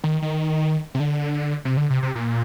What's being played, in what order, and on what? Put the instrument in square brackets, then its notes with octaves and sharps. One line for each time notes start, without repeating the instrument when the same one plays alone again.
[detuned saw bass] D#3
D#3
C3
D3
C3
D3
C3
C3
A#2